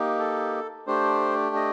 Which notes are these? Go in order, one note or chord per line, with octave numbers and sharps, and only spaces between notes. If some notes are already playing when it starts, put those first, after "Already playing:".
Already playing: A#3 D#4 G4
A4
A3 D4 G4 C5
D#5